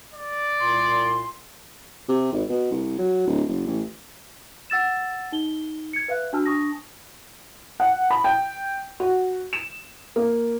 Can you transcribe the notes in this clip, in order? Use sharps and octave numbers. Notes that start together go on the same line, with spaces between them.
D5
C2 A#2 C6
C3
G#1
B2
C2
F#3
D1
F#1
A1
F#5 E6 A6 E7
D#4 G7
G#6 C#7
B4 E5 F5 F#6
D4 F#4 A5 E6 F6
D4 A5 C#6 D#6 A#6
F#5
B5
G5
F#4
E7
A#3